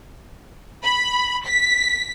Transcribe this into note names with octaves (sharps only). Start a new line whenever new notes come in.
B5
B6